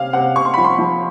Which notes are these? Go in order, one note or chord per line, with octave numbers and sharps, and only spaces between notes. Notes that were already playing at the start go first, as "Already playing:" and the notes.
Already playing: C3 C#4 F5
C3 F#5
C3 C#6
C6
F3 B5
C6
F3